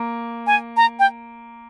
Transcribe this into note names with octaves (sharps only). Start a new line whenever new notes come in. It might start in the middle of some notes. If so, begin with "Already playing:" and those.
Already playing: A#3
G#5
A#5
G5